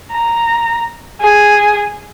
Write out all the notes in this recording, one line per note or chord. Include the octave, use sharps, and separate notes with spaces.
A#5
G#4